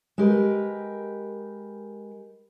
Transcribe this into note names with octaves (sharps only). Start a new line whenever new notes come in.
G#3 G4 A#4 B4